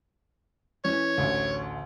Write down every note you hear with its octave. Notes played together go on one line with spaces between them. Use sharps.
E3 C#4 C#5
A1 D2